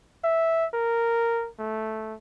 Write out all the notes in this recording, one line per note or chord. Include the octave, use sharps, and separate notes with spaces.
E5
A#4
A3